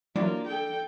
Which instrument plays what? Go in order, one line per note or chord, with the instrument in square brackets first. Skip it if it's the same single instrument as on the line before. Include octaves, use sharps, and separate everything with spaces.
[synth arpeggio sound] E3 F#3 [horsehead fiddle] A#3 F4 [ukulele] D4
[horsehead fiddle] A4 G5